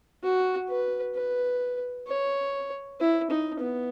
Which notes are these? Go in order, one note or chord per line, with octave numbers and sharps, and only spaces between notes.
F#4
B4
B4
C#5
E4
D#4
B3